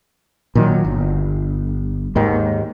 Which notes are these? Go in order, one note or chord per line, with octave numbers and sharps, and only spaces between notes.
A#2 D#3 F#3
G1
D#2 G#2 D#3